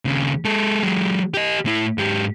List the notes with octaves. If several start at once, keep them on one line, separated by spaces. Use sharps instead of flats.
D#2 C#3
G#3 A4
F#3 G#3
G4 D#5
A2 E4
G#2 G4